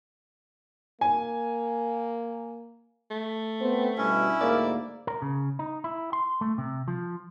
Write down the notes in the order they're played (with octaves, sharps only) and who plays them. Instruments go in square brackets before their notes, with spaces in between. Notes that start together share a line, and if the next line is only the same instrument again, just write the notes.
[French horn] A#3 [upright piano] G#5
[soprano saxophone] A3
[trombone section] B3 C4
[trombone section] G2 B2 [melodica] C#4 [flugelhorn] E4
[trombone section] D2 G#2 A#3 [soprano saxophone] D5
[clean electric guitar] A#4
C#3
D#4
E4
C6
A3
C3
F3